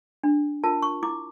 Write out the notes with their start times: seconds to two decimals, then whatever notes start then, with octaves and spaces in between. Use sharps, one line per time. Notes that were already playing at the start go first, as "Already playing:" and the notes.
0.24 D4
0.64 F4 A#4 A5
0.83 C#6
1.03 E4 D6